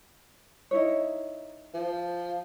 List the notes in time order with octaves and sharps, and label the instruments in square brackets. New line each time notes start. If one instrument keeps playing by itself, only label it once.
[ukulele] D#4 E4 C#5
[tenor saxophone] F3